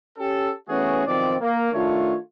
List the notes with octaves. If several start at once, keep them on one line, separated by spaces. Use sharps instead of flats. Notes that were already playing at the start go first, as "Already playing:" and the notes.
C#4 G4 A4
E3 A3 B3 C#4 F#4 G#4
B1 D#3 F3 C4 D5
A#3
D#3 A3 D4 F4 C#5